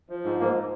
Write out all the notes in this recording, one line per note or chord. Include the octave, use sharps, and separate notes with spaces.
F3
G#2
G#2 A#3